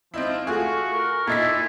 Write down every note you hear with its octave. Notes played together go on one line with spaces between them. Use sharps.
F3 C4 D#4 E4
A3 F4 F#4 G#4 C#6
A#4
A#2 D#4 E4 A4 B6